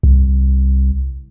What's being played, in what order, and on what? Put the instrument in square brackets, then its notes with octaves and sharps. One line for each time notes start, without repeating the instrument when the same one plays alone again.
[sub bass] C2